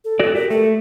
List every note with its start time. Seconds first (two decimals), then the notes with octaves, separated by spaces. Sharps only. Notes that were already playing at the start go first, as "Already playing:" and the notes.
0.05 A4
0.20 F#4 D5
0.35 G4 A#4
0.50 A3 A4